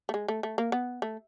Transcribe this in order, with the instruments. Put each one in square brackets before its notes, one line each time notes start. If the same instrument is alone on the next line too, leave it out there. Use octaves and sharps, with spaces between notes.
[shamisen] A3
G#3
A3
A3
A#3
B3
A3